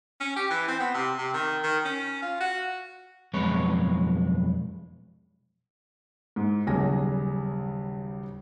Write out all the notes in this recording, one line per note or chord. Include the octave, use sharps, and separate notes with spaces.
C#4
G4
E3
C4
B3
C3
C3
D#3
D#3
C#4
F4
F#4
B1 F2 G#3 B4 C#5
G#2
D#1 B1 C#3 G#5 A#6